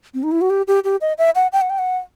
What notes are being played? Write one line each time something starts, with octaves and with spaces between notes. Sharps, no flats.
C4
D#4
E4
F#4
G4
G4
G4
D#5
E5
F#5
G5
F#5
G5
F#5